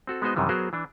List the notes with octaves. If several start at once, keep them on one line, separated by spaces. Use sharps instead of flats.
C4 F#4 A4
G#3 B3 D#4 F#4 C5 D#5
F#2 C3 D#3 E3 G3
F#3 B3 F#4 G#4 A#4 C5
E3 D4